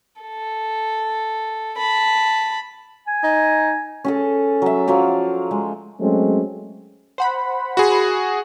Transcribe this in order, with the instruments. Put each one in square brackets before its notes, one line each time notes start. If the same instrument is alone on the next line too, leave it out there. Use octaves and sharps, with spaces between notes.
[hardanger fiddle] A4
A5 B5
[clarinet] G#5
[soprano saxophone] D#4
[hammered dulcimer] C#4 G#4 A4
F#3 E5
F3 F#3 F5 D6
G#3
[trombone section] F#3 G#3 A3 C4 C#4
[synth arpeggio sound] C5 F#5 B5
[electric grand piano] F#4 G#4